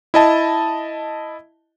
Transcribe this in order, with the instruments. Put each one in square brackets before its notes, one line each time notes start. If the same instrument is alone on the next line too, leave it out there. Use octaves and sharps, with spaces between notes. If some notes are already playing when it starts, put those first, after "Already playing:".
[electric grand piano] E4 D#5 A5